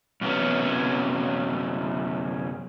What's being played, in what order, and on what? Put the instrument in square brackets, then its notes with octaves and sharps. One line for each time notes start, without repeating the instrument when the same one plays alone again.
[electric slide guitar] F#2 C3 F#3 B3 C#4